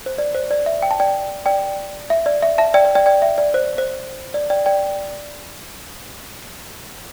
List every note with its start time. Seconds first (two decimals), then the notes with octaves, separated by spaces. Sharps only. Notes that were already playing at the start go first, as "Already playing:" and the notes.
0.06 C5
0.18 D5
0.35 C5
0.51 D5
0.66 E5
0.83 G5
0.91 A5
1.00 D5 G5
1.46 D5 G5
2.10 E5
2.26 D5
2.42 E5
2.58 E5 A5
2.74 D5 G5
2.85 D5
2.95 D5 G5
3.06 D5 G5
3.22 E5
3.38 D5
3.54 C5
3.78 C5
4.34 D5
4.50 D5 G5
4.66 D5 G5